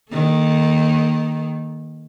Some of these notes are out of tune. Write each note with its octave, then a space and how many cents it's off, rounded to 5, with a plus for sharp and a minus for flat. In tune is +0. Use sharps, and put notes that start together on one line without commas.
D#3 +0 A#3 +0 A4 -25